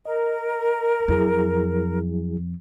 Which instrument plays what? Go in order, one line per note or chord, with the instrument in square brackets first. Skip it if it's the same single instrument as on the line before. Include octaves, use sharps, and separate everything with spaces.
[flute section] A#4 [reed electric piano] D#5
[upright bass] F2 [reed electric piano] F#3 E4 G#4